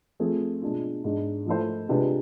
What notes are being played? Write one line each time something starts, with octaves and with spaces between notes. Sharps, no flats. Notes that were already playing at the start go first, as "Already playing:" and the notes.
F3 A3 C4 G#4
B2 G#3 D4 F4
G#2 G#3 D4
F3 A3 E4 A4 C5
C3 G#3 D4 F4 B4